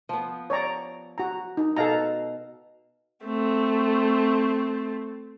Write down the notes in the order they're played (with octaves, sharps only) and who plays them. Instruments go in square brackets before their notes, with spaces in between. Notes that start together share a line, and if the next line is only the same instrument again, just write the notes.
[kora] F3 B3
[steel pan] C#5 D5 A#5
F#4 A#5
D#4
[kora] B2 [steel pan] A4 F5 A#5
[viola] A3 C4